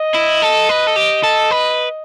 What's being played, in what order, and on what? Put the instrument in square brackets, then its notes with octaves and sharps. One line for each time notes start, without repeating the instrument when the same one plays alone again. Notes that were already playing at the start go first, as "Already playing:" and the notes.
Already playing: [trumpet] D#5
[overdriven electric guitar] E4
A4
B4
A4
G4
A4
B4